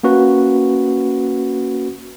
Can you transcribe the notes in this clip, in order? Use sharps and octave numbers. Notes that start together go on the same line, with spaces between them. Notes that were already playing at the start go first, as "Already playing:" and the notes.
A#3 C#4 F#4 B4